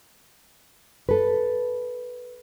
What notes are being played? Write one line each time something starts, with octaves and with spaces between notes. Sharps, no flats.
A4 B4